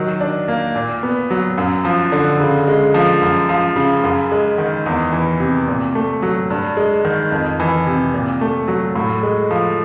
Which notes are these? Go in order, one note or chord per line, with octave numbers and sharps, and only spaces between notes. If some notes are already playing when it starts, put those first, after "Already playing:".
Already playing: D#3 F#3
D4
A#3
A#2
B3
F#3
F#2
F3
D3
C#3
G#3
F3
F#2
F3
C#3
F#2
G#3
D#3
E2
E3
C3
A#2
A3
F#3
G2
G#3
D#3
F2
E3
C3
A#2
A3
F#3
A2
G#3
F3